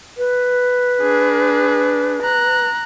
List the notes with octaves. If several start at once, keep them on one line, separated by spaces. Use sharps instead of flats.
B4
D4 G#4
A#5 F#6